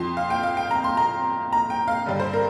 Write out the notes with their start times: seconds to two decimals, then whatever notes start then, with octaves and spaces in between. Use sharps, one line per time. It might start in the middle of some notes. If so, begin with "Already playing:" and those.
Already playing: F2 F3 C6
0.17 F5
0.30 G5
0.43 F5
0.57 G5
0.71 A#5
0.84 C6
0.97 A#5
1.53 A#5
1.70 G5
1.88 F5
2.06 G2 D3 G3
2.19 C5
2.33 A#4